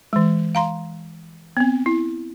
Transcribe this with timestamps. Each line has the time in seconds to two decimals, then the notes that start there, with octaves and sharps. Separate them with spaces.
0.13 E3 G#3
0.55 F5 A#5 C6
1.57 B3 C4
1.86 E4